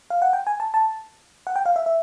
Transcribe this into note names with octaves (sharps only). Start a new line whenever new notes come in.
F5
F#5
G5
G#5
A5
A5
F#5
G5
F5
E5
E5